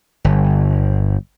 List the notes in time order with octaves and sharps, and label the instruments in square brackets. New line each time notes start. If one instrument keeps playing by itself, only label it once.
[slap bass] G1